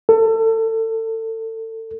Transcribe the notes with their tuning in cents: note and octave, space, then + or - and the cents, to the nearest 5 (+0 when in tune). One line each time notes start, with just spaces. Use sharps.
A4 +30